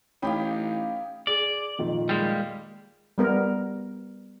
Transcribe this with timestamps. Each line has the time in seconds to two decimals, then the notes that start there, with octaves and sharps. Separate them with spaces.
0.22 A1 C#4 D#4 G4 F5 G5 B5
1.27 G#4 D5
1.78 F2 A#2 D#3
2.09 G3 G#3 A#3
3.18 G3 B3 A#4